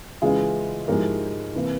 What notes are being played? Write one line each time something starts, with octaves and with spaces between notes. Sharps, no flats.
C#3 E3 G#3 E4 F4 G#4
G#2 F3 G#3 E4 G4 A#4
C3 E3 A#3